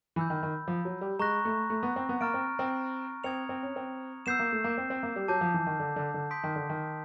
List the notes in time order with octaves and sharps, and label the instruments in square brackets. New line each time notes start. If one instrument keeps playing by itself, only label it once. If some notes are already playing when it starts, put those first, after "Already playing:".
[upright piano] E3 [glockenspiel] B5 E6 G6
[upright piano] D#3
D#3
F3
F#3
G3
[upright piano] G#3 [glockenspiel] A#5 C#6 F#6 A#6
[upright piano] A3
A3
B3
C4
B3
[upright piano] A#3 [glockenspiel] A#5 C#6 F6 A6 D7
[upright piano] C4
C4
[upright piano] C4 [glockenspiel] D#6 G#6 C#7 F7
[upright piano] C4
C#4
C4
[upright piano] B3 [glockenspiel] E6 G6 C7 E7
[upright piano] A#3
A3
A#3
C4
C4
A#3
G3
[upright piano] F#3 [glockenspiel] A5 D6 G6
[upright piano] F3
E3
D#3
D3
D3
D3
[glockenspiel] C6 D#6 G6 B6 D7
[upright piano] D#3
D3
D#3